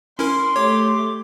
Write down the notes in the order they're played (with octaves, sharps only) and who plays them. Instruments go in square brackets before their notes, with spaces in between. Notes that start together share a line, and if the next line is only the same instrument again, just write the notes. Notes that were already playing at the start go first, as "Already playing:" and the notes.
[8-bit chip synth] C#4 E4 A#4 [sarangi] C6
[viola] A3 G4 [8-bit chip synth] C#5 [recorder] D6